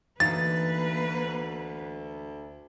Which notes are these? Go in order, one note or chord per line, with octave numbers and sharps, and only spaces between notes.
D2 E3 A#3 D#4 B4 F5 A6